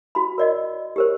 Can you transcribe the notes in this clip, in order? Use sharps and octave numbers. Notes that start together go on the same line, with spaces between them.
F#4 B5
A#4 D5 D#5
G4 A#4 C5